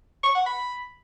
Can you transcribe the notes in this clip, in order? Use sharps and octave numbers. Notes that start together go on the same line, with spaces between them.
C#6
F#5
B5